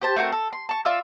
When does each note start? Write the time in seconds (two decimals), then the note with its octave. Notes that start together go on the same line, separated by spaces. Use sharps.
0.02 G4 C5 A5
0.16 A3 C4 F#4 A#4
0.32 A4
0.53 C6
0.69 A5 C#6
0.85 F4 D5 E5 E6